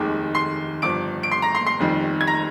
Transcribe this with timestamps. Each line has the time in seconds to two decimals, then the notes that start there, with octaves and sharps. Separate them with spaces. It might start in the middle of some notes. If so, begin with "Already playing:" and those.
Already playing: F1 D#2 D#3 G#3 D6
0.35 C6 C7
0.82 G1 G2 F3 D6 D7
1.23 D7
1.31 C6 C7
1.42 A#5 A#6
1.55 C6 C7
1.67 C6 C7
1.79 F1 F2 D#3 G3
2.21 G#6
2.27 A#5 A#6